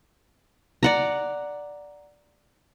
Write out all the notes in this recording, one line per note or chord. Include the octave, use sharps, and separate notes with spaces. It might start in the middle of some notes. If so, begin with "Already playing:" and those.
D5 F#5 A#5